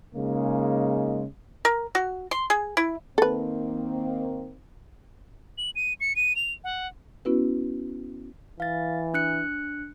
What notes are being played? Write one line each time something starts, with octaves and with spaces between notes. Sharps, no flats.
C#3 G#3 A#3 D#4
A#4
F#4
C6
G#4
E4
D#3 A#3 C4 A4 B4
F#7
D#7
C#7
D#7
F7
F#5
B3 C#4 E4 F#4 B4
E3 F5 A6
D4 F#6 C#7